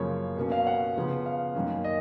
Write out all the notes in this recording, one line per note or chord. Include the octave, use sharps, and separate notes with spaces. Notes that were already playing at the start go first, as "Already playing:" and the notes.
Already playing: F#2 C#3 F3 A#3 C#5
B2 A#3 C#4
F5
F#5
C#3 F3 B3
F5
F#2 D#3 A#3 C#4
D#5